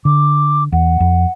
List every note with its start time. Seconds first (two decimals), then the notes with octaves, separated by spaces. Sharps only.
0.05 D3 D6
0.72 E2 F#5
1.00 F2